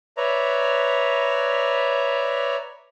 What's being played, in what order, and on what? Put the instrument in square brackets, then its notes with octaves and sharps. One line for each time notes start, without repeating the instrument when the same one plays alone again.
[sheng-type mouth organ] B4 C#5 D5 E5 A#5